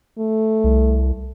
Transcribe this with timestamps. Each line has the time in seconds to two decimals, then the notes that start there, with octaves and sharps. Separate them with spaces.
0.18 A3
0.64 C2